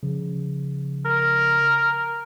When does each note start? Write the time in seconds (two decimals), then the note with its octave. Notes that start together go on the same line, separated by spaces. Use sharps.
0.03 C#3 F3
1.05 A#4